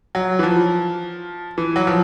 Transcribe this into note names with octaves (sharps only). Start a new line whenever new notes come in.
F#3
E3
F3
E3
F#3
F3